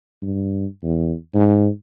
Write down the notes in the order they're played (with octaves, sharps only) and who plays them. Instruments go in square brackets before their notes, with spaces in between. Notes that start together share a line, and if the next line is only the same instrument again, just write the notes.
[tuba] G2
E2
G#2